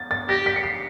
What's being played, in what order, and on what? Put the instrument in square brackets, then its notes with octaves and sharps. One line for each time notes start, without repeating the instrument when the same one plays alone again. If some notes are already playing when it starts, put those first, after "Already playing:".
Already playing: [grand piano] A6
A6
[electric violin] G4 [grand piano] A#6
[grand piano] B6
C#7
C7